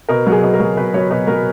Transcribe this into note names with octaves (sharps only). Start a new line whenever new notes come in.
B2 A#4
F#3
G#4
B2
A#4
F#3
B2 B4
F#3 C#5
B2 B4
F#3 A#4